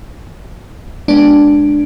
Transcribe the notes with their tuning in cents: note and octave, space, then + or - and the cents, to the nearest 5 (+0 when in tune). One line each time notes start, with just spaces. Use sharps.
G#3 +0 B3 -20 D4 +0